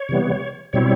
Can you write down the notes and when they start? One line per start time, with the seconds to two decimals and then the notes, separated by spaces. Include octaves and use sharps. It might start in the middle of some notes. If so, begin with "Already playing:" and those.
Already playing: C#5
0.09 C3 E3 G3 B3
0.73 B2 G3 C4 E4 C#5